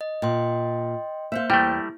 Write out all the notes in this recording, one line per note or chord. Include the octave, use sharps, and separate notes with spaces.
D#5
A#2 D#5 G5 C6
A#3 C5 E5 F5 G6
E2 G3 A3 E4 G5